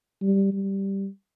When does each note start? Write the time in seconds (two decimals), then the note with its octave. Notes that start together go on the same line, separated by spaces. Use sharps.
0.22 G3
0.53 G3